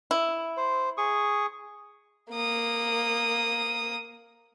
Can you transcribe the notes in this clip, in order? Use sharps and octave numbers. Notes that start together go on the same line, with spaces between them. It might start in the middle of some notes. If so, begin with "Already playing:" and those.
E4
C5
G#4 C#6 D#6
A#3 D#6